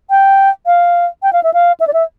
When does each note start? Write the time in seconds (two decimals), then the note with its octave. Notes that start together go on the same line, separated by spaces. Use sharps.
0.10 G5
0.66 F5
1.23 G5
1.33 F5
1.43 E5
1.54 F5
1.80 E5
1.87 D5
1.93 E5